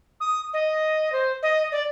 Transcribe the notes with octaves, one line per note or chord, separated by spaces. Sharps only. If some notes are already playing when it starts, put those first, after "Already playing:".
D#6
D#5
C5
D#5
D5